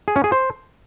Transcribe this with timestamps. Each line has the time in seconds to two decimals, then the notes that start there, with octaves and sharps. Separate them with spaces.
0.08 G#4
0.16 C#4
0.24 G#4
0.32 C5